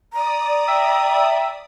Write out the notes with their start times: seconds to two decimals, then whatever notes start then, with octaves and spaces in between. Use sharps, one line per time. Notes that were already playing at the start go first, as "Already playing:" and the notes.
0.13 D5 A#5 D#6
0.68 E5 G5